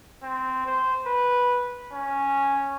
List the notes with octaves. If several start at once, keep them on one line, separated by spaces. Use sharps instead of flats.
C4
C5
B4
C#4